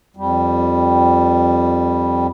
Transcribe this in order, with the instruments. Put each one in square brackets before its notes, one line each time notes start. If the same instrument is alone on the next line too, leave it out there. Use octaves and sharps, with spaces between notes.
[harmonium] F2 G3